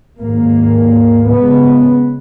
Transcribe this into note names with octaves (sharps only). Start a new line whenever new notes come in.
D#2 G#2 A#3
C#3 G#3 B3